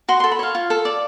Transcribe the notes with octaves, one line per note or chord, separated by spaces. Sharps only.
F#4 C6
A4 C6
B5
C#5 F5
F4
A4
D5